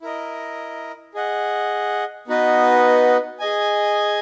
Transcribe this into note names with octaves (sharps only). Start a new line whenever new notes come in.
E4 A#4 D#5
G#4 D#5 F#5
B3 D#4 F#4 B4 D#5
G#4 D#5 G#5